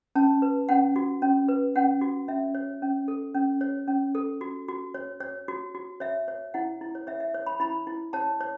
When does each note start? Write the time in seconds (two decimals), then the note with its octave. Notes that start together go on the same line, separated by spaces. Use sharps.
0.15 C#4 A5
0.42 B4
0.69 C#4 F#5
0.96 F#4
1.22 C#4
1.48 B4
1.76 C#4 F#5
2.01 F#4
2.28 C#4 E5
2.55 C#5
2.82 C#4
3.08 A4
3.35 C#4
3.61 C#5
3.88 C#4
4.15 A4
4.41 F#4
4.68 F#4
4.94 C#5
5.20 C#5
5.48 F#4
5.75 F#4
6.00 C#5 E5
6.28 C#5
6.54 E4 F#5
6.81 E4
6.95 C#5
7.07 C#5 E5
7.20 E5
7.34 C#5
7.46 B5
7.60 E4 B5
7.87 E4
8.13 C#5 A5
8.41 C#5